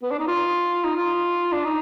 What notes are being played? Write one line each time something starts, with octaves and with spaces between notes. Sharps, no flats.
B3
D4
D#4
F4
D#4
F4
D4
D#4